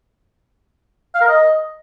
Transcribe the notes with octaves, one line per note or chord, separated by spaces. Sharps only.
F5
A#4
D#5